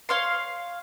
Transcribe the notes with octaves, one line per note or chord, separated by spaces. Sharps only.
C#5 F5 C6